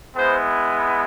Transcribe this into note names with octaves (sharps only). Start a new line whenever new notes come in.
G#3 B3 E4 C5